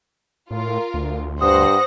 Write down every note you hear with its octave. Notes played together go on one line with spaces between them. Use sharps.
A2 F4 A#4
D2
G2 C5 F#5 D#6 A#6